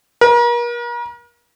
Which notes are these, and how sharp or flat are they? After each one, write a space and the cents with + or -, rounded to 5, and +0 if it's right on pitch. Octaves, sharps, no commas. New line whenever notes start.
A#4 +40